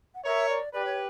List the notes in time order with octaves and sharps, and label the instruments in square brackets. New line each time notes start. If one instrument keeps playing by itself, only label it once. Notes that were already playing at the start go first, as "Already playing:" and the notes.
[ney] F#5
[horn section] A#4 C#5 [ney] E5
[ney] D5
[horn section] G4 B4 [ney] D5
[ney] C#5